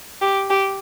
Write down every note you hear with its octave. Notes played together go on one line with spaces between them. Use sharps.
G4
G4